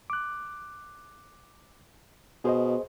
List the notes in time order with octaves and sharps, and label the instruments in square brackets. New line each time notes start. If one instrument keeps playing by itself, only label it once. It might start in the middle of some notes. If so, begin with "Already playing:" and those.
[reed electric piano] D6 F#6
[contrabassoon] B2 [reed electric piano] G#4 C5 D#5